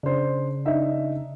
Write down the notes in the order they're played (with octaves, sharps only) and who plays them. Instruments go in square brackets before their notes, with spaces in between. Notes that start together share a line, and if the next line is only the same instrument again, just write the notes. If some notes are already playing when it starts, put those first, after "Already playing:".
[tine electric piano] C#3 [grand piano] D4 C5
[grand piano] D4 D#4 E5